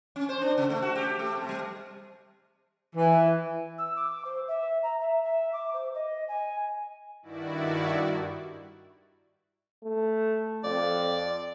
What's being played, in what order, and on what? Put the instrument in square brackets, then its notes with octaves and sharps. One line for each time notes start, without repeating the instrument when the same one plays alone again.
[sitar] C#4
C5
D4
C#3
A3
F#4
G4
A3
C3
G3
[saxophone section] E3
[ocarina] E6
D6
C5
E5
A#5
E5
E5
D6
C5
D#5
G#5
[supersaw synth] G2 D#3 E4 F#4 D5
[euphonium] A3
[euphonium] F2 [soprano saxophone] D5